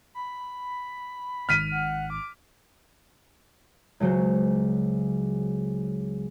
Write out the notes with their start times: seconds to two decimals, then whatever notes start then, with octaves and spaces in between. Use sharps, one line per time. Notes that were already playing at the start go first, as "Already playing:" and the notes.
0.15 B5
1.49 G#1 G#2 D#3 F6 B6 D#7
1.71 F#5
2.10 D6
4.00 C#2 C#3 F#3 F#4 C5